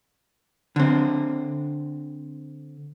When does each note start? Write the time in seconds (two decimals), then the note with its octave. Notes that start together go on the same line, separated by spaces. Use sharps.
0.76 D3 C4